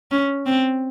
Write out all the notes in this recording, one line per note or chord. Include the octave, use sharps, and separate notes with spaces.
C#4
C4